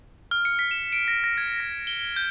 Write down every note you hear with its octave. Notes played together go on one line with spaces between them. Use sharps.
F6
C#7
B6
E7
D7
A#6
A#6
G#6
A#6
G7
G7
G6